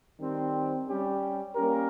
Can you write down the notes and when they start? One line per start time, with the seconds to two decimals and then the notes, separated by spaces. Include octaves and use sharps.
0.19 D#3 G3 C4
0.88 G3 C#4 G4
1.55 G3 A#3 C#4 G4 A#4